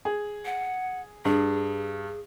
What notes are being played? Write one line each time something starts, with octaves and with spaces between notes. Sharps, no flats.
G#4
F#5
G2 G#4